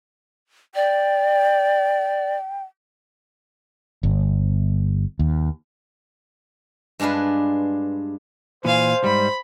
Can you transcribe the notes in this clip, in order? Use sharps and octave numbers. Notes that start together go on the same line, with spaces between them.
D5 G5
G1
D#2
G2 G#3 D4 F4 B4
A#2 E3 C5 F5 G#5
G#2 G3 B5